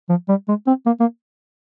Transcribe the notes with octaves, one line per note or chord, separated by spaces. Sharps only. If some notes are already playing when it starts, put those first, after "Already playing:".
F3
G3
G#3
C4
A#3
A#3